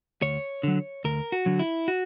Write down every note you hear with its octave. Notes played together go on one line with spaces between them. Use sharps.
D2 C#5
D3 F#3
D2 A#4
F#4
D3 F#3
E4
F#4